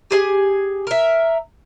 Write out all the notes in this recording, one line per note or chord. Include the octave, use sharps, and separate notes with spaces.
G4 G#4 G#5
A#4 E5